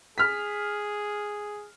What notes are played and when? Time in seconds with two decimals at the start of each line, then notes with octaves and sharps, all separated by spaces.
0.18 G#4 F6 B6